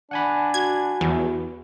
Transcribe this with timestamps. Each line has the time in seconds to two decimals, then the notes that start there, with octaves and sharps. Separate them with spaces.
0.11 D4 F#5 G#5 B5
0.54 F#4 G#6
1.01 E2